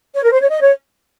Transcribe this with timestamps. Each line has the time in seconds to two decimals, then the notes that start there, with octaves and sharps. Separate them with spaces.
0.14 C#5
0.23 A#4
0.32 C5
0.40 C#5
0.49 D#5
0.61 C#5